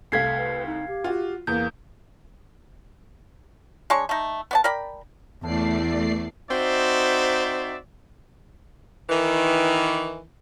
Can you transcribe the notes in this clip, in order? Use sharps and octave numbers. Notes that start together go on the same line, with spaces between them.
C2 A3 F5 G#6 B6 C7
B4
D#4
G4
F4 F#4
E2 A#3 G6
G#3 D4 C#5 C#6
A3 D#4
B3 D5 A5
A#4 D5 G5 B5
E2 A2 A3 D5 A5 C7
C4 D#4 F#4 C5 D5 E5
D#3 E3